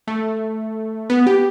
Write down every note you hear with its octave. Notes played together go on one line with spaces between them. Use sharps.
A3
B3
G4